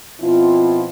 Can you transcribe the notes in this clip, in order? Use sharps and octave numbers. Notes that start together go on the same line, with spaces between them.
B2 F3 C4 E4 F4